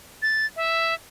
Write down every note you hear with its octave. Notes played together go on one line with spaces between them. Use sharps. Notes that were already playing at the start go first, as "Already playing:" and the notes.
A6
E5